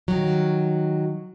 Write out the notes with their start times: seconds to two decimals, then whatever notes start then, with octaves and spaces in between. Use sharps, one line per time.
0.08 D#3 F#3